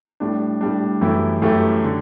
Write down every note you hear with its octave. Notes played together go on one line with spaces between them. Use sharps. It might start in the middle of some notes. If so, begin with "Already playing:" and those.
A2 G3 D4
A2 G3 D4
F#2 E3 A3 E4 G4
F#2 E3 A3 E4 G4
D3